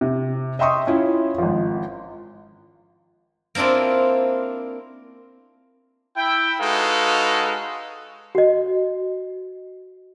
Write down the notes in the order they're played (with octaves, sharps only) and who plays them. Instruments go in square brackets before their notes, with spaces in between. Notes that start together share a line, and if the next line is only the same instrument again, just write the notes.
[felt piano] C3
D#5 E5 G5 C6 C#6 D#6
C#4 E4 F4
G#1 F3
[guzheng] A#3 C4 D4 E4 F4
[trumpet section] E4 G5
G#3 D#4 F#4 A4 B4 F5
[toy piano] F#4 D#5